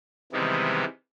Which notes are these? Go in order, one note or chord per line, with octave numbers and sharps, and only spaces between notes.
C3 D#3 E3 G3 G#3 B3